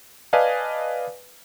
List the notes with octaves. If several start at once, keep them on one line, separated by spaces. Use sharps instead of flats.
B4 D5 D#5 F5 G#5 A5